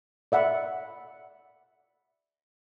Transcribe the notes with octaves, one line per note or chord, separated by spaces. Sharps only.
D5 E5 F#5 B5